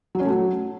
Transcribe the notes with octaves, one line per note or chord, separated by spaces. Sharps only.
F#3
C#4
A3
F#3